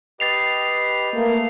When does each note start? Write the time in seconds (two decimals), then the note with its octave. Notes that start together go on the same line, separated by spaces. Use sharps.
0.20 G4 B4 D#5 A6 C7 F7
1.15 A3 A#3